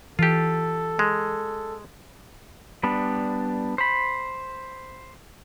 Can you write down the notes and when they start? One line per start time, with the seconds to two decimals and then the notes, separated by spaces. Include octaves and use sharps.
0.19 E3 F4 G4 A4
0.99 G#3
2.83 G3 B3 D4
3.78 C5 B5